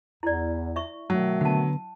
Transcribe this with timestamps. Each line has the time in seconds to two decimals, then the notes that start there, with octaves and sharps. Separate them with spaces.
0.23 E2 E4 D5
0.76 E5 C#6
1.10 B2 D#3 F#3 A3
1.41 D3 B3 F#5 A5